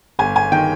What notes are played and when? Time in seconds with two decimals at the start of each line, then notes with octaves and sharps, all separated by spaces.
0.19 G1 G#5
0.36 G#5
0.52 D#3 G5